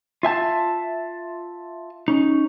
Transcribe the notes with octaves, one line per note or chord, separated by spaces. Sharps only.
F4 E5 G#5 A5
C#4 D#4